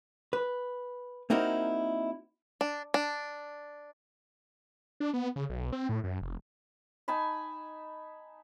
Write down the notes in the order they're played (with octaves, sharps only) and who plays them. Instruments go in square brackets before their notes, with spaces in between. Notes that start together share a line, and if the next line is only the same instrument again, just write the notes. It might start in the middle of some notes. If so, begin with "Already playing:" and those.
[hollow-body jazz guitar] B4
A#3 C4 D#4 E4 F#4 A#4
[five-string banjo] D4
D4
[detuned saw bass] D4
B3
C#3
B1
C4
A2
F#2
F1
[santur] D#4 G#5 A5 B5